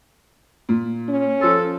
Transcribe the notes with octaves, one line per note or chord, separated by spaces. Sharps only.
A#2
C#4
F3 A4 C5 C6